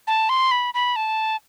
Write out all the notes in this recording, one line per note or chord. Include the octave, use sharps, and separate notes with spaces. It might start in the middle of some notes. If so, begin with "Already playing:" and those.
A5
C6
B5
B5
A5